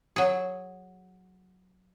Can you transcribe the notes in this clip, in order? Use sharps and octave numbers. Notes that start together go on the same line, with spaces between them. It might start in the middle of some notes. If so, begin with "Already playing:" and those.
F#3 G#4